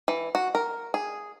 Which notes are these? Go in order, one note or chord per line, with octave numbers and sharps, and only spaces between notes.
E3
F#4
A#4
G#4